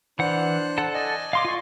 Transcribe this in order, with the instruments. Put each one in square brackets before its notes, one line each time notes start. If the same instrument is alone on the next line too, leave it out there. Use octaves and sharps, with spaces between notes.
[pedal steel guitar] E3 F#5 [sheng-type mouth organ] D4 C5 F#6
[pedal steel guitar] A4 F#5 A5
[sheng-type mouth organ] D5 D#5 G#5
[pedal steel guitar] F5 C6 D6
F4 C#6